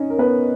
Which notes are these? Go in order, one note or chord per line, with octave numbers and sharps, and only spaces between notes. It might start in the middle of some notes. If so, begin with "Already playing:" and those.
Already playing: C#4 D#4 C#5 D#5
A#4
B3 B4